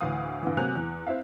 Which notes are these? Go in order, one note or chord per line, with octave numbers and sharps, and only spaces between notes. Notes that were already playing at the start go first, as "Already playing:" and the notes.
D2 A2 E3 F5 D#6
G2 D3 E3
C3 F#3 A#3 G#5 F#6 F7
E2
C4 E4 E5 F5